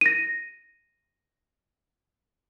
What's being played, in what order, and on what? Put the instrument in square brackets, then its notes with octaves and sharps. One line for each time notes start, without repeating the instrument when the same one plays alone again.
[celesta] A#6 D#7